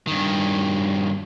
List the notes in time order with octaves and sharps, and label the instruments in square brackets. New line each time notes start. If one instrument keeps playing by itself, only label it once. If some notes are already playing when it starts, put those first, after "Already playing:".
[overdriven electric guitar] G2 D#3